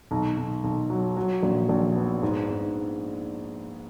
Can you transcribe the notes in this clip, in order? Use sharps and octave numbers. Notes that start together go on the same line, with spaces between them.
B1
B1
B1
F#3
F#3
A#1
A#1
B3
G#2
G#2